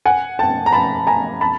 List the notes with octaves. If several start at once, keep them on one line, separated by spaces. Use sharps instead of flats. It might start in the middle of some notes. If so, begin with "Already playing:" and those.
F#5 G#5
G5 A5
A#5
A5 B5
G#5 A#5
A5 B5